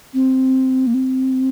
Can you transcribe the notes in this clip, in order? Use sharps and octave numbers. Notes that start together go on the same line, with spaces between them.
C4
A#3
C4